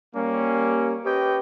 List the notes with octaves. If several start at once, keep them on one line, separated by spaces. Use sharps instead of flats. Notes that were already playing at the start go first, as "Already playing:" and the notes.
G3 A#3 C#4
C#4 G4 B4 C#5 D#5 G5